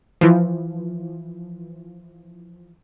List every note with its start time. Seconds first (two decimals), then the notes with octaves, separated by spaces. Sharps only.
0.21 E3 F3